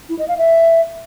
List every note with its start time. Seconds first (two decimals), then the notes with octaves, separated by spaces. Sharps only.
0.09 E4
0.19 D#5
0.28 F5
0.38 E5